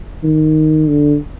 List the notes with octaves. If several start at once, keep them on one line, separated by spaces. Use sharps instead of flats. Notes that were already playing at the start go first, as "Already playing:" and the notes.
D#3
D3